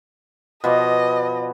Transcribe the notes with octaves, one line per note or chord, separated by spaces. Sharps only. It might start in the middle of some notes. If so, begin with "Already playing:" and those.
B2 F3 D5 D#5